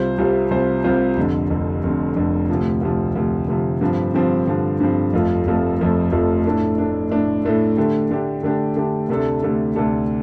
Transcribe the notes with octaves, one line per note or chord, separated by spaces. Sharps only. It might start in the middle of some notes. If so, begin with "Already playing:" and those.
Already playing: C2 C3 G3 F4 C5
C2 C3 G3 F4 C5
C2 C3 G3 F4 C5
C2 C3 G3 F4 C5
F1 F2 D3
F1 F2 D3
F1 F2 D3
F1 F2 D3
D2 C3 F3
D2 C3 F3
D2 C3 F3
D2 C3 F3
G2 D3 F3 C4
G2 D3 F3 C4
G2 D3 F3 C4
G2 D3 F3 C4
F1 F2 F3 A3 F4
F1 F2 F3 A3 F4
F1 F2 F3 A3 F4
F1 F2 F3 A3 F4
A2 A3 D4
A2 A3 D4
A2 A3 D4
A2 A3 D4
D3 A3 D4 G4
D3 A3 D4 G4
D3 A3 D4 G4
D3 A3 D4 G4
D2 C3 A3 D4 A4
D2 C3 A3 D4 A4
D2 C3 A3 D4 A4